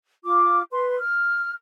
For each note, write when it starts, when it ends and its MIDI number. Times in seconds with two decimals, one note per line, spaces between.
0.25 0.62 65
0.25 0.62 86
0.72 0.99 71
0.72 0.99 84
0.99 1.53 89